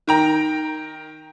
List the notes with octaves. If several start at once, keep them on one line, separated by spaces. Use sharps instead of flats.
D#3 G5 A#5